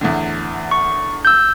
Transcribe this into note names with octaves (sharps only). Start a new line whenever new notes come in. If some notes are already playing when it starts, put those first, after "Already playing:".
E2 A2 D3
C#6
E6 G6